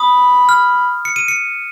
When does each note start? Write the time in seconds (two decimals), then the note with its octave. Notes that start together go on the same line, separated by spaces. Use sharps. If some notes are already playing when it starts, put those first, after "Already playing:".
Already playing: B5 D#6
0.49 F6
1.05 C#7
1.16 D#7
1.28 C#7